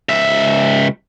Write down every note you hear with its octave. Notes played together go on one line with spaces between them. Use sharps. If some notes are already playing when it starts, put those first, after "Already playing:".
C#2 E5